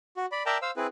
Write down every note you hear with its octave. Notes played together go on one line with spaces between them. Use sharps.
F#4
D5 B5
A#4 D5 E5 G5 A5 A#5
C5 F5 E6
C4 E4 G#4 B4